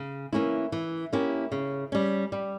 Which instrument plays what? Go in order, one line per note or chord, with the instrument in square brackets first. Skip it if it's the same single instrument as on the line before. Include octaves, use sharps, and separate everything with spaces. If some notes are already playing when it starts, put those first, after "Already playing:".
Already playing: [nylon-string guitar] C#3
E3 A#3 C#4 E4
E3
A#3 C#4 E4 G4
C#3
G3 C#4
G3